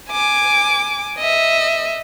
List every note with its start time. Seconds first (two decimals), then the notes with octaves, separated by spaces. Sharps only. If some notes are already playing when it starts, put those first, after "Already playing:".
0.10 G#5 D6
1.19 D#5 E5